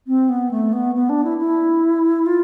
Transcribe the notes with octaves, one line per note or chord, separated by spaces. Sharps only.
C4
B3
A3
B3
B3
D4
E4
E4
F4